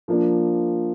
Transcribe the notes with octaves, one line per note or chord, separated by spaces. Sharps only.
F3 A#3 D4